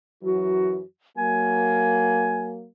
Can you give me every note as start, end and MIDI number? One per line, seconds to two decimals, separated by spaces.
0.23 0.81 42
0.23 0.81 52
0.23 0.81 54
0.23 0.84 66
1.18 2.68 54
1.18 2.68 58
1.18 2.51 80